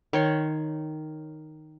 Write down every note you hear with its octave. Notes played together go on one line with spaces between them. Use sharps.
D#3 C#5 C6